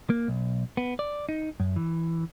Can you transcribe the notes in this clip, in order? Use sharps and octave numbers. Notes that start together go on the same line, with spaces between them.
A#3
B1
B3
D5
D#4
F#2
E3